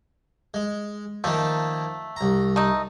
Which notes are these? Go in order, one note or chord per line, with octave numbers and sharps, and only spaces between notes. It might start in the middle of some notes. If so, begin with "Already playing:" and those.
G#3
D#3 F3 A3 A#3
C2 A#5
A3 D#4